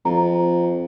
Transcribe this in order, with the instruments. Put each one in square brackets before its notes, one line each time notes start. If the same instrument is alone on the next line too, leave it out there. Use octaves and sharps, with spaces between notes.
[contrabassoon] F2 [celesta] A#5